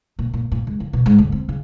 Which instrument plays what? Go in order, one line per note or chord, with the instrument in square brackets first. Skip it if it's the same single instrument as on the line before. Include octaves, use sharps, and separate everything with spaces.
[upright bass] A#2
A#2
A#2
C#2
F3
B2
G#2
D2
C4
C#3